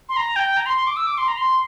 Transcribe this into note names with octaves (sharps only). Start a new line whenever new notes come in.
C6
A#5
G5
A#5
C6
C6
D6
E6
D6
C6
A#5
C6